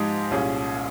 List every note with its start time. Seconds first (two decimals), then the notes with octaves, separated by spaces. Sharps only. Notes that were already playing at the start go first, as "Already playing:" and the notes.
Already playing: G#2 F3 G#3 D#4 G4
0.31 C2 A#2 G3 C#4 G#4